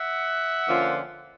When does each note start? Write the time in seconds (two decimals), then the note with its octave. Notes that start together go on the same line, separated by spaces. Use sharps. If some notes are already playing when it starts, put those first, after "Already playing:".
Already playing: E5 F#5
0.68 D3 F3 A#3 C#4 F4